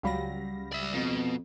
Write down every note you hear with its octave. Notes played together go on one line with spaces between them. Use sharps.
C#2 F#3 G3 F5 B5 A#6
D5 E5
F2 B2